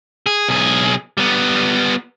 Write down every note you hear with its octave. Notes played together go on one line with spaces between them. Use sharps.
G#4
B1 G#4
G3 B3